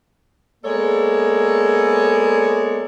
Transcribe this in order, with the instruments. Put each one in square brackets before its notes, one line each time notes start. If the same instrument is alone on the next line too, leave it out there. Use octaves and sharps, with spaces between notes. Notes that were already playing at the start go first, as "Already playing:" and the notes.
[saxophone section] G#3 A#3 B3 A4 C#5 D5